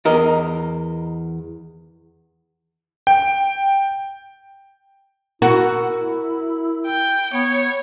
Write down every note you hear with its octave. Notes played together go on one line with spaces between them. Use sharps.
E2 A#4 D#5
G5
E4 F#4 A#4
G5
B3 C#5